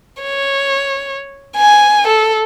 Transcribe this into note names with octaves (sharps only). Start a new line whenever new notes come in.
C#5
G#5
A4